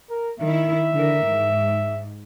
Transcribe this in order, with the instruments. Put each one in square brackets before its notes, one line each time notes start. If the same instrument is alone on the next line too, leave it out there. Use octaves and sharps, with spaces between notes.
[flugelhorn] A#4
[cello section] D#3 E4 [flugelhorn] E5
[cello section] D3 E3 A#4
G#2